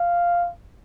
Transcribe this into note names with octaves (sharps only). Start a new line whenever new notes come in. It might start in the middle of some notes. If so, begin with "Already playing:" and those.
Already playing: F5